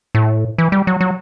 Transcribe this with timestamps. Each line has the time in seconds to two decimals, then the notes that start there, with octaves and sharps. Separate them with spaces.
0.15 A2
0.58 E3
0.72 G3
0.87 F#3
1.01 F#3